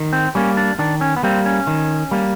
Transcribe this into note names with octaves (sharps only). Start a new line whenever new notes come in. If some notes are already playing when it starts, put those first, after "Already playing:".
Already playing: D#3
C4
G3 A#3 C#4
D4
D#3 D4
C#4
B3
G3 A#3 C4
C#4
D#3
G3 A#3